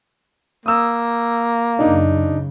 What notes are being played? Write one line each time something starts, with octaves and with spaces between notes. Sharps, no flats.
A#3 D#6 E6
F#2 C#3 D4 D#4